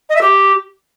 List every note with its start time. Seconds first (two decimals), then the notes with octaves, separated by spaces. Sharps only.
0.10 D#5
0.15 E5
0.21 G4